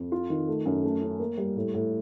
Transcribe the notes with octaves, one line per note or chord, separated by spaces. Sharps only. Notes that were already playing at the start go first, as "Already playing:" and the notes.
Already playing: F2
F4
D#3
A3
F#2
A3
C#4
A#3
G3
A2
A2